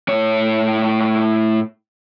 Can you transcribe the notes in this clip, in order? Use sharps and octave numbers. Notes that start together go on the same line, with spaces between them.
A2 C#5